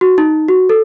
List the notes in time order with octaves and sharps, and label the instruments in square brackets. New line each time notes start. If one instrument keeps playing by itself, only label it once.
[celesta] F#4
D#4
F#4
A4